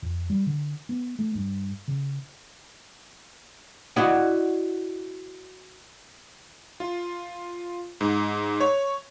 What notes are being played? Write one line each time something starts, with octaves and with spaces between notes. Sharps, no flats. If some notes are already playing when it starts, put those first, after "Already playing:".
F2
G3
D3
B3
A3
G2
C#3
E4 F#4 D5 D#5 F#5
F4
G#2
C#5